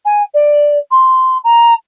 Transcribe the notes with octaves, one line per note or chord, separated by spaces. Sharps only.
G#5
D5
C6
A#5